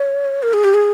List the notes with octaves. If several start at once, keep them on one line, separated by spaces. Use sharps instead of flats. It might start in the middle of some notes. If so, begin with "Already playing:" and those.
Already playing: C#5
A#4
G#4
G4
G#4